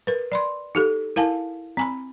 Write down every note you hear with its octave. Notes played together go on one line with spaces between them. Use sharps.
A#4 B4
D5 B5 C6
D#4 G4 A4
E4 A#4 F5 G#5 A5
C4 G#5 B5